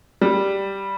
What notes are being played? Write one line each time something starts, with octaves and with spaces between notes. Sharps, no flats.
G3